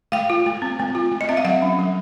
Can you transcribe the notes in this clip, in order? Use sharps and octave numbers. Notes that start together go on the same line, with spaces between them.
A3 F5 G5
F4
A3
C4
A3
F4
A3
D#5
C4 E5
F5
F#3 E5 F#5
C#4
F#3